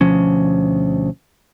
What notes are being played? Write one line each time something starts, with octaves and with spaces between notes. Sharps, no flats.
D2 B2 F3 C#4